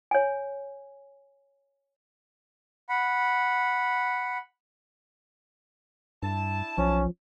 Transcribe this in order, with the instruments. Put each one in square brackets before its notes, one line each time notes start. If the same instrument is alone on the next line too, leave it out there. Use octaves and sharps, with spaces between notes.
[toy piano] C#5 G#5
[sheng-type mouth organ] F#5 B5
[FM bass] G2 [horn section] D4 E4 A5
[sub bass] B1 [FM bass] F3 [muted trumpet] C#4